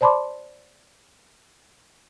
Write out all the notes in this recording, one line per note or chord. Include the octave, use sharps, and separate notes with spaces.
C5 D5 A5 B5 C6 D6